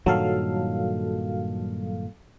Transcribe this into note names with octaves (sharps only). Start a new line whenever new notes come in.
G2 A#2 D#3 F#3 A4 F5